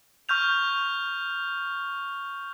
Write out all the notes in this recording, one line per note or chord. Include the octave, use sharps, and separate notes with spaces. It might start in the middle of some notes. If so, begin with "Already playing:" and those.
C#6 F6 G6 F7